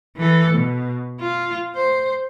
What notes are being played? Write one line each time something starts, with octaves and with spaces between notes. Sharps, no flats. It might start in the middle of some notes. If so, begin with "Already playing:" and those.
E3 A4
B2
F4
C5